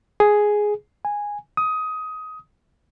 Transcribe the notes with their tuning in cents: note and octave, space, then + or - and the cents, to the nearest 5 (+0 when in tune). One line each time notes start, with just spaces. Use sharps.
G#4 +5
G#5 -10
D#6 +15